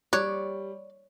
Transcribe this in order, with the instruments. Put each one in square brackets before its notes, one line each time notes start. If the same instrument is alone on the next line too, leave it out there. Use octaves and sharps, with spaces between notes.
[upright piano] G3 [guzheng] C#5 [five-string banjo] D5 [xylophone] F#6